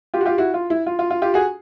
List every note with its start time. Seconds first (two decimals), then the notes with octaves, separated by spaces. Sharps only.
0.14 F4 G4
0.21 F#4
0.26 F4 G4
0.38 E4 F#4
0.54 F4
0.70 E4
0.86 F4
0.99 F4
1.11 F4
1.22 F4 G4
1.34 F#4 G#4